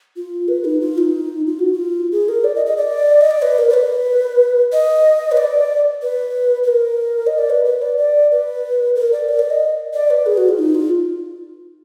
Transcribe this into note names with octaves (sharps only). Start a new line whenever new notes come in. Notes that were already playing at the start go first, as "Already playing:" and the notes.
F4
B4
D#4
F4
D#4
F4
F#4
F4
G#4
A#4
D5
D#5
D#5
D5
D#5
D5
B4
A#4
D5
B4
D#5
B4
D5
B4
B4
A#4
D#5
D5
B4
B4
D5
D5
B4
A#4
D5
A#4
D5
D#5
D5
B4
G#4
F#4
F4
D#4
F4